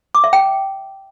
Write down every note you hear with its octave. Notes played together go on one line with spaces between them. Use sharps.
D6
E5
G5